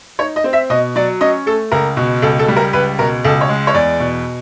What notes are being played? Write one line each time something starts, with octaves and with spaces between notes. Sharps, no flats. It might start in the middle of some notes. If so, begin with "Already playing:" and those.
D#4 C#5
D#5
C4
E5
B2 D#5
F#3 D5
C#4 D#5
A3 A4
C#2 A#4
B2
C#2 A4
A4
G3
A#4
C#2 B4
B2 A#4
C#2 A4
C#5
G#3
C#5
E2 D5
B2